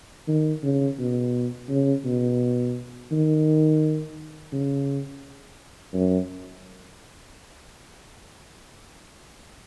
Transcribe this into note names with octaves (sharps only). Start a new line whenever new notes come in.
D#3
C#3
B2
C#3
B2
D#3
C#3
F#2